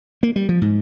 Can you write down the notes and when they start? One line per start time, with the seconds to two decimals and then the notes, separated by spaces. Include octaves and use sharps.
0.23 A#3
0.36 G3
0.49 F3
0.62 G#2